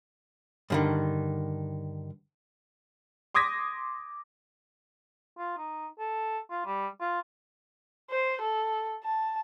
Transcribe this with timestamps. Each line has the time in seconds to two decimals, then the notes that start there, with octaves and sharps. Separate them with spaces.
0.70 G2 D3 D#3
3.34 C6 D6 D#6 G#6 A#6 B6
5.38 F4
5.57 D#4
5.99 A4
6.50 F4
6.66 G3
7.00 F4
8.11 C5
8.42 A4
9.04 A5